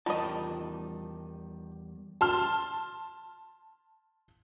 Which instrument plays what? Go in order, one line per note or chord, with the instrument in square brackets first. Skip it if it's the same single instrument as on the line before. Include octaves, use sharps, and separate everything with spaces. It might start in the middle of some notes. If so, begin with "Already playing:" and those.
[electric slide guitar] E2 G3 A5 [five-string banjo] D#3 D#5 [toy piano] F4
[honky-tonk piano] A5 C6 F6